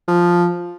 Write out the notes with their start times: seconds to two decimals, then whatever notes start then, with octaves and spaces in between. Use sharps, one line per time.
0.08 F3